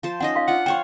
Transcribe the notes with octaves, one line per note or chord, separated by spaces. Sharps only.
F3 C5 A5
C#4 D#4 D#5 F#5
F5 C6
D4 F4 F#5
C5 C#5 F5 G5 C#6